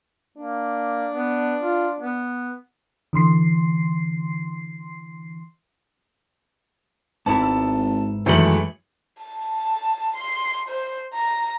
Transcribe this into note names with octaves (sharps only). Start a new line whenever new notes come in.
A#3 D4
B3
F4
B3
D3 E3 C6 C7
G#1 G#2 B3 E4 A5
E6
F#2 D#3 E3 G#3 A3 C#4 C#7 F#7
A5
C6
C5
A#5